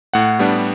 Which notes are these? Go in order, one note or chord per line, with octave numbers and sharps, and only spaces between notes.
A2 F#5
G3 B3 D4